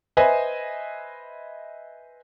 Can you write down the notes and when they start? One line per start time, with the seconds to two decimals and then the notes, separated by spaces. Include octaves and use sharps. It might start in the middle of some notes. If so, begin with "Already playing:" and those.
0.17 B4 C5 D#5 E5 G#5